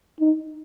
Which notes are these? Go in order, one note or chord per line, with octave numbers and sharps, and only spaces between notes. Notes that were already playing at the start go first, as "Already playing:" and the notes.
D#4